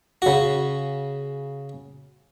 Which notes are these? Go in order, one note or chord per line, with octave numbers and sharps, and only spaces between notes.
C#3 F#4